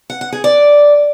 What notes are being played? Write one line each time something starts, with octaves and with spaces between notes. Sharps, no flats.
F#5
F#5
G#4
D5